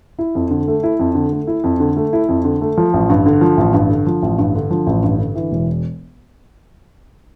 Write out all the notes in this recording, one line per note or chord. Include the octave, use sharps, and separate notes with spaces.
E4
F2
D3
A3
E4
F2
D3
A3
E4
F2
D3
A3
E4
F2
D3
A3
F3
A1
G2
D3
F3
A1
G2
D3
F3
A1
G2
D3
F3
A1
G2
D3
E3
E1